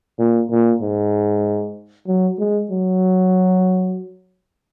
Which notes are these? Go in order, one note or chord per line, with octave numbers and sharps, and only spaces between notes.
A#2
A#2
G#2
F#3
G#3
F#3